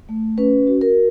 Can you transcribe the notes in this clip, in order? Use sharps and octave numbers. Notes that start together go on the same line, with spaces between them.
A3
C#4 B4
F#4
A#4